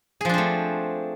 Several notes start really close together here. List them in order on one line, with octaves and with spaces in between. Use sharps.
G#4 F3 D4 C4 A3